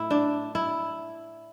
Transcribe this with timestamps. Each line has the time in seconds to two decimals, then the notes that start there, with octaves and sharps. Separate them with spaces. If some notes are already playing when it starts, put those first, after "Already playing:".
Already playing: A2 E4
0.11 D4
0.55 E4